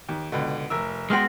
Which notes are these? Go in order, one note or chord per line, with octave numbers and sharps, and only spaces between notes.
D#2
C#2 B2 D3
F1 A#4 E6
G#3 B3 F#4 G5 C6 F6